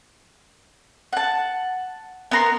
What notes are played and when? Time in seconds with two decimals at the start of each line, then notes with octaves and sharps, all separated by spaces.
1.13 F#5 A5
2.31 B3 A#4 C6